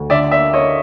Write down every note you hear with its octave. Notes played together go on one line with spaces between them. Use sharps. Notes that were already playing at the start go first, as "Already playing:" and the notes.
Already playing: D2
D3 D5 E5
A#3 D5 E5
A#3 C#5 D#5